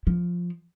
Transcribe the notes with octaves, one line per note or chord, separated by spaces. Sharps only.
F3